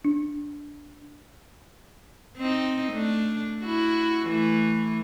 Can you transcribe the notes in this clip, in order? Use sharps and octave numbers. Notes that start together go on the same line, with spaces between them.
D4
C4 D#4
A3 D4
E4 F#4
E3 A3